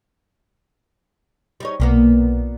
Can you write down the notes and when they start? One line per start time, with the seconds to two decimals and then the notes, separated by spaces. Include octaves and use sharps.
1.60 G3 D#4 C#5
1.80 B1 A#2 A#3 B3